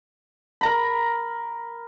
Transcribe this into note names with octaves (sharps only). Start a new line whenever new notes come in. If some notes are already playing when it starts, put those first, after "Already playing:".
A#4 A#5 B5